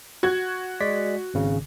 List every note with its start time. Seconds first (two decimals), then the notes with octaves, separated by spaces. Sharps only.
0.23 F#4 G#6
0.81 G#3 D5 B6
1.34 G#1 C#3